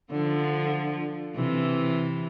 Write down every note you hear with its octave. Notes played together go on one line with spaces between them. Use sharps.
D3 F3
C3 E3